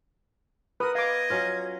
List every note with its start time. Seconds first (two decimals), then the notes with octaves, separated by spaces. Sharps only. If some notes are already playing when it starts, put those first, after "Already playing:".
0.80 B3 A#4 B4 D#6
0.95 D#5 F5 D6 G#6
1.30 F#3 C#4 F4